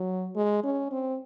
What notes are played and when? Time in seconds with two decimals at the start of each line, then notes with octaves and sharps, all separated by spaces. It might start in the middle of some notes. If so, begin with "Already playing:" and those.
Already playing: F#3
0.35 G#3
0.63 C#4
0.91 C4